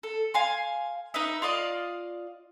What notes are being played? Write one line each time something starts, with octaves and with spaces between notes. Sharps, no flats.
A4
F5 G#5 C6
D#4 B4 D#5 E5
F4 D5 D#5 F5